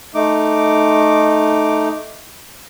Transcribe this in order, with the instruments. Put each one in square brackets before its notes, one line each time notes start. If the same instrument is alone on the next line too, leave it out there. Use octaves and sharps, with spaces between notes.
[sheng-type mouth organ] A3 D#4 D6